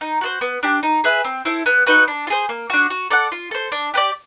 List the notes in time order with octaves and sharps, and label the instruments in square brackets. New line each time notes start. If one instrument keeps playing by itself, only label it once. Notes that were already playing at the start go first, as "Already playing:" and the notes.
[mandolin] D#4
F#4 A4 C5
B3
D4 G4
D#4
G#4 B4 E5
C4
E4 A4 C5
B3
D#4 F#4 B4
D4
F4
G#4 C5
A#3
D4 F#4
F#4
A4 D5 F#5
F4
A4 C5
D4
G4 B4 D5